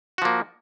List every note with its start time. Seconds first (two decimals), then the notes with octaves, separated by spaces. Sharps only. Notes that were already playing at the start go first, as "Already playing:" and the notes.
0.18 F#4
0.22 F3
0.25 A#3